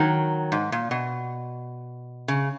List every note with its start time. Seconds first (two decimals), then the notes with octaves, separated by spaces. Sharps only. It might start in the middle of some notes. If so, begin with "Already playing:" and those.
Already playing: D#3 F#3
0.52 G#2
0.72 A#2
0.91 B2
2.28 C#3